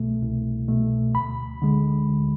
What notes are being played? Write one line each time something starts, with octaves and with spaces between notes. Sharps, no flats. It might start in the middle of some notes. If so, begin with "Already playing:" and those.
Already playing: C2 B2 A3
C2
B2 A3
D2 B5
D3 G#3
D2